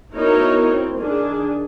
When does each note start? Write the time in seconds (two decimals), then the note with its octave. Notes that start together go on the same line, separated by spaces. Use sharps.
0.12 B3 D#4 E4 F#4 A#4 C#5
0.70 C4
0.99 D#3 D4 G#4